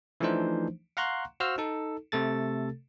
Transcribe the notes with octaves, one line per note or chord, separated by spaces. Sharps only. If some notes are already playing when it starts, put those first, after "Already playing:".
E3 F3 A3 D4 D#4 C5
F5 F#5 A#5 C6 C#6 F#6
F#4 C5 F5 E6 F6
D#4 A4
C3 A3 A4 A6